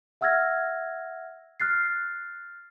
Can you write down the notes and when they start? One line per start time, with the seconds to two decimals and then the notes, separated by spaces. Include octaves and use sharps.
0.21 E5 F#5 E6 F6 G#6 A#6
1.60 F6 F#6 A6 C7